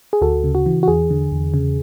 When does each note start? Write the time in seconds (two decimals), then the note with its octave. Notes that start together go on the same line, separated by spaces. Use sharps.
0.13 G#4
0.21 D2 F#4 A4
0.44 C#3
0.55 F#4
0.66 E3
0.83 F#4
0.88 E2 G#4
1.11 D3
1.32 E2
1.54 C#3